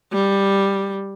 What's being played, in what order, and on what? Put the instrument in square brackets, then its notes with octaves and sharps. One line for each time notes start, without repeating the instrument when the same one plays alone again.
[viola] G3